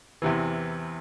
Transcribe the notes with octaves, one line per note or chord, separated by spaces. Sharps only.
E2 C3 E3